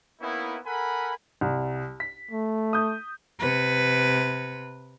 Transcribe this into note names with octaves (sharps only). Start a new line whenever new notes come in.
A#3 B3 C#4 D#4 E4
A4 A#4 F#5 G#5 B5
C2
B6
A3
D#6 G6
C3 B4